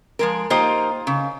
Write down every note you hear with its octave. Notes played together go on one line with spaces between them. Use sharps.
F3 G#3 A#4
A#3 D#4 F4 G4 C5 D#5
C#3